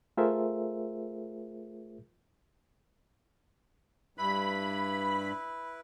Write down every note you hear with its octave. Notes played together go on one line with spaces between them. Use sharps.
A3 F4 G#4 A#4 C5 E5
G2 E4 B4 B5